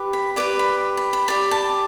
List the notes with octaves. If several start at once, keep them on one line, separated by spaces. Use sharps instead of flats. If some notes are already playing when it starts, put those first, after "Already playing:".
Already playing: G4 B4
B5
G4 B4 D5 D6
B5
B5
B5
G4 D5 B5
A5